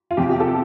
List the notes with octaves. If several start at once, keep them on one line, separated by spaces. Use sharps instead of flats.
F4
E2 C3 F3 G4
G4
A4